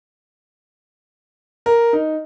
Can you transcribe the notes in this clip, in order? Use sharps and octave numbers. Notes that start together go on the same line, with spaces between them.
A#4
D#4